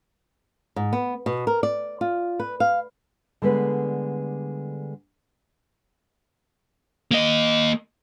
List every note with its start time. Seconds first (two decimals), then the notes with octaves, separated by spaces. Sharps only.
0.76 G#2
0.93 B3
1.26 B2
1.47 A#4
1.63 D5
2.01 F4
2.40 B4
2.60 F5
3.42 D3 G3 G#3 B3 D4 B4
7.11 A#3 D#5